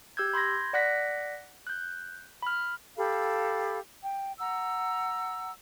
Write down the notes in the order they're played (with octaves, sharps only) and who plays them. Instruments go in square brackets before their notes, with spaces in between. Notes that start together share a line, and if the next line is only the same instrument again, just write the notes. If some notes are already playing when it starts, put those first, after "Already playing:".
[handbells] G4 E6 G6 G#6
B5 C6 G6 G#6 A#6
D5 F#5 F#6 A#6 B6
F#6 G6
B5 F6
[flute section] G4 A4 F5 B5
G5
F#5 A#5 E6